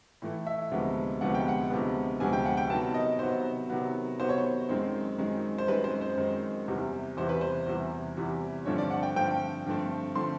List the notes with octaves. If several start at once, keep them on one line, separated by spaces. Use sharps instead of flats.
A2 E3 A3
E5
D2 C3 F3 G#3 B3
D2 C3 F3 G#3 B3 F#5
G5
F#5
D2 C3 F3 G#3 B3
D2 C3 F3 G#3 B3 G#5
G5
F#5
G5
C3 D#3 F#3 B3 A5
D#5
C3 D#3 F#3 B3 C5
C3 D#3 F#3 B3
C3 D#3 F#3 B3 C5
C#5
C5
F#2 D#3 G#3 C4 D#4
F#2 D#3 G#3 C4 D#4
C5
F#2 D#3 G#3 C4 D#4 B4
C5
C5
F#2 D#3 G#3 C4 D#4
E2 C3 E3 G3
E2 C3 E3 G3 C5
B4
C5
E2 C3 E3 G3
E2 C3 E3 G3
G2 D3 F3 A3 C4 C#5
D5
F#5
G5
G2 D3 F3 A3 C4 G5
G2 D3 F3 A3 C4
D3 F3 A3 C4 C6